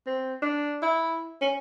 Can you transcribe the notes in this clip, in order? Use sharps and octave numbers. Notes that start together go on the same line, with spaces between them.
C4
D4
E4
C#4